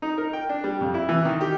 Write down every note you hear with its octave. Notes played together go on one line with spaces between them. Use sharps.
D#4
A#4
G5
D4
G3
F2
E4
E3
D#3
G4